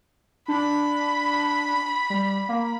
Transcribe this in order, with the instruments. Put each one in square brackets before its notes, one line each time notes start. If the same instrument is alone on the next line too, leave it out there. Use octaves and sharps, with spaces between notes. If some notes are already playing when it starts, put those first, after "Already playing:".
[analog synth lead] D4 [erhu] B5
[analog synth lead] G3
A#3